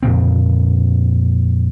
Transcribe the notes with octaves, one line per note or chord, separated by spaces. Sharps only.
F2 A#2 C#3 C4